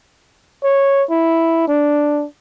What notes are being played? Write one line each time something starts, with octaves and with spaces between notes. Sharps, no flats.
C#5
E4
D4